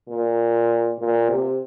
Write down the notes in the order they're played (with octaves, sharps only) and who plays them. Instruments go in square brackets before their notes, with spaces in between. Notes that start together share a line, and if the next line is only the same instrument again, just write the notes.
[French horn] A#2
A#2
C3